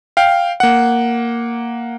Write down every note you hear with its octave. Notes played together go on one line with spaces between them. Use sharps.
F5 G5
A#3 F#5